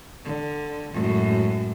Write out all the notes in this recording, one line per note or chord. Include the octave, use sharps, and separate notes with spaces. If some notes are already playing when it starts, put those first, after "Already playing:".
D3
F#2 A2 G#3